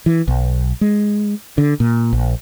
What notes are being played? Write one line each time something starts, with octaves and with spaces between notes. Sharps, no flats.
E3
B1
G#3
D3
A#2
A#1